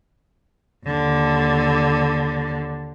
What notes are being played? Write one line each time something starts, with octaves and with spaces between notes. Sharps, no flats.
D#2 D3